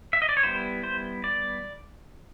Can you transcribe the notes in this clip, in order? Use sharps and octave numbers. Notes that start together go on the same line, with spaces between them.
E5
D#5
D5
C#5
G3 B3 E4 C5
C5
D5